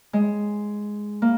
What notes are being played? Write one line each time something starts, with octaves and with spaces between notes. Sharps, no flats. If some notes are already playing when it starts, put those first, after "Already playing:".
G#3
A#3